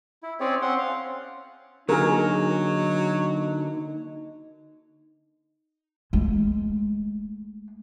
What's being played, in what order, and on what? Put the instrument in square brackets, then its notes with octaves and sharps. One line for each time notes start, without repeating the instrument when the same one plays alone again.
[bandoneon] E4
C4 C#4 G#4 C#5 D5
C4 C#4 F#5 C6
F5
[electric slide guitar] D3 A#3 [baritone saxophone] F#3 [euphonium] D#4 [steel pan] G#4 A#4
[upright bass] G#3 A3